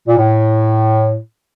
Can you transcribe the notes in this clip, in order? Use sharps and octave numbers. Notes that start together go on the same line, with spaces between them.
A#2
A2